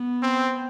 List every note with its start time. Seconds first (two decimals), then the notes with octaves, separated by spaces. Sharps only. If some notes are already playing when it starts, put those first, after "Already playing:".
Already playing: B3
0.22 C4